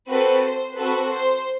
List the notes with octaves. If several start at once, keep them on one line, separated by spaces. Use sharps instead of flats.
C4 F#4 A4 B4
C5
C4 F#4 A4 B4
C5